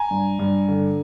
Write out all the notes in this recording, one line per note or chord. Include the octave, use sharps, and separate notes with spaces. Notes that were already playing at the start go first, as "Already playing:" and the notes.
Already playing: G#5 A#5
G2
G2
D3